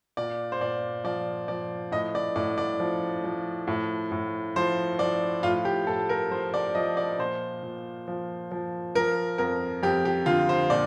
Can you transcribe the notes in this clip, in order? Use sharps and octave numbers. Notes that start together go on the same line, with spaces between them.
A#2 D5
C5
A#2 D5
F3 D5
F3 D5
A2 D#5
D5
A2 D5
D5
F3
F3
A2
A2
F3 C5
F3 D5
A2 F4
G4
A2 A4
A#4
F3 C5
D5
F3 D#5
D5
A#2 C5
A#2
F3
F3
F3 A#4
F2 A#4
F2 G4
G4
D3 F4
C5
A#2 D5